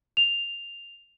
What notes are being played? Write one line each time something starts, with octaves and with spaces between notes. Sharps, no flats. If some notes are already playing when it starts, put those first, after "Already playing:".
F7